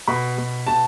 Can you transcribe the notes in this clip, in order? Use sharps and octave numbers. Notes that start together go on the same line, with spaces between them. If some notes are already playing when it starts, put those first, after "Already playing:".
B2 B5
B2
B2 A5